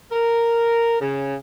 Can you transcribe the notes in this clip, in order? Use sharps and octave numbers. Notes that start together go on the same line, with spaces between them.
A#4
C#3